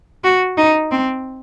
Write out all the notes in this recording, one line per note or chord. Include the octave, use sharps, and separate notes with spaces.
F#4
D#4
C4